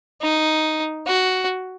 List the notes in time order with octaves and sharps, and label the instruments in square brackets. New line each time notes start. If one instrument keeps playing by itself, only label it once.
[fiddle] D#4
F#4